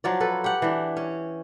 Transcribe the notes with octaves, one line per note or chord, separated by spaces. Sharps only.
F3 F#3 F4 D5
A4 B4
G4 F#5
E3 D4
C#4